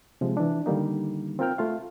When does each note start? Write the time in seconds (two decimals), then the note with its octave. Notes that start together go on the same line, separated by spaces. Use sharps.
0.21 C3 F3 G#3
0.37 E3 D4
0.66 D3 D#3 G3 A#3 D#4
1.39 C4 F4 A#4 G5 F6
1.58 A3 F4 F5